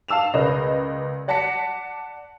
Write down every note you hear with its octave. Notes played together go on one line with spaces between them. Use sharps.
F5 A5 E6 E7 F7
C#2 A#4 B4 D5 D#5
D5 F#5 A5 A#6 B6 C#7